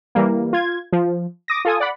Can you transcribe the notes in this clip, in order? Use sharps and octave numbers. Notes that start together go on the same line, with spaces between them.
E3 G3 A#3
F4 G#6
F3
D6 D#6 A#6
F4 A4 G#5 D#6
D5 F#5 B5